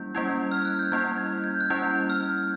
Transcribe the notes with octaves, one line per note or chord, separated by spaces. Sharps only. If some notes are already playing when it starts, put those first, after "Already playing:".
Already playing: G3 A#3 C#4 E4 G6
G3 A#3 C#4 E4 G#6
F6
F#6
G6
G3 A#3 C#4 E4 G#6
G#6
G6
F#6
G3 A#3 C#4 E4 G6
F6